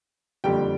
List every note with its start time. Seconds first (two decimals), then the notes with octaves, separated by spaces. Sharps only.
0.44 F#1 F2 D3 G3 G4 G5